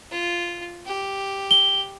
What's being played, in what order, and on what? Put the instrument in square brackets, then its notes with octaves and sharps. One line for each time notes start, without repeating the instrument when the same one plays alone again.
[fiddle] F4
G4
[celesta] G7